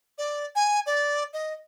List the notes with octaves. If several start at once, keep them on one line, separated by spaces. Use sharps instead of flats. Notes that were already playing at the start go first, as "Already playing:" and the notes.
D5
G#5
D5
D#5